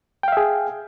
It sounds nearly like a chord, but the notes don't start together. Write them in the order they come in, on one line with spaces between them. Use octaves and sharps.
G5 F5 E5 G#4